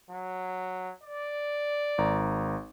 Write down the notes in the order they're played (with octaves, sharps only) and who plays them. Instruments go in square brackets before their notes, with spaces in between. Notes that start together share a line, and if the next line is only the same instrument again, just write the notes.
[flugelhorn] F#3
D5
[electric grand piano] G#1 A#5